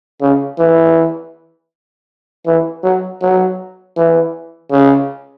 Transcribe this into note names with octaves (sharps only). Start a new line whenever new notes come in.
C#3
E3
E3
F#3
F#3
E3
C#3